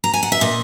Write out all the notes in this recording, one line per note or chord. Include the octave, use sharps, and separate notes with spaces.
A#5
G#5
F#5
E5
A#2 D#5